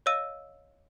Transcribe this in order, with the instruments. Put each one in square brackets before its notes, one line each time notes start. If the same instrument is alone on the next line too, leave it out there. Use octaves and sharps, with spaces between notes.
[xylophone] C#5 D#5 F5 E6 D#7